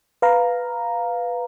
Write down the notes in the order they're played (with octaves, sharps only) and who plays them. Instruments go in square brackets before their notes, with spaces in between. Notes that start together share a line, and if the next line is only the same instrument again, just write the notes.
[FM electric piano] B4 F5 A#5